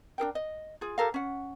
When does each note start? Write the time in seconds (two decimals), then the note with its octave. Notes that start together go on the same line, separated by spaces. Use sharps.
0.18 D4 G#4 A#4 G5
0.35 D#5
0.81 F4 G#4
0.98 G4 A4 A#4 F5
1.14 C#4 F#5